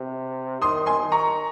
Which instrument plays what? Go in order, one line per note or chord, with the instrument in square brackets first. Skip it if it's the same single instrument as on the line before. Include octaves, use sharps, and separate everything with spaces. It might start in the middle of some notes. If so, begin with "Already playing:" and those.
Already playing: [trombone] C3
[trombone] D#3 [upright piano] C6 D#6
[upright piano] G#5 C6
[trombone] D#3
[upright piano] A#5 C#6